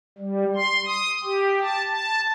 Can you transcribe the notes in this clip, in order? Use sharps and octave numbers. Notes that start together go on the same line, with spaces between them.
G3
C6
D#6
G4
A5
A5